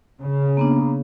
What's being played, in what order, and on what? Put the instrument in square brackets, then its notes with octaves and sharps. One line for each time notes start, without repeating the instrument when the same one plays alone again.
[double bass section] C#3
[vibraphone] A#3 B3 D4